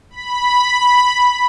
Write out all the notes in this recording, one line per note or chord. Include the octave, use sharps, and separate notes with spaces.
B5